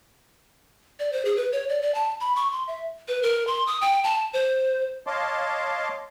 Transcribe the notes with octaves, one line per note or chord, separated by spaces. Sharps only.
D5
C5
G#4
B4
C#5
D5
D5
A5
B5
C#6
C6
E5
B4
A#4
C6
D#6
G5
A5
C5
C#5 D#5 F5 A5 C6 D6